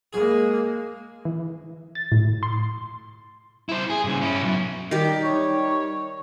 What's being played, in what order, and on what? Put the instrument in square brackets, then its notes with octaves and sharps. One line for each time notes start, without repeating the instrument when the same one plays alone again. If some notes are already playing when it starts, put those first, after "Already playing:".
[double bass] G#3 A#3 [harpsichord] G#4
[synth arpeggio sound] E3
A6
A2
C6
[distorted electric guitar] E4 C5
G#4
G2 C#3
C#4 E4
B1 F#3
[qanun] D#3 G4 [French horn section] G3 D#4
[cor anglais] C#5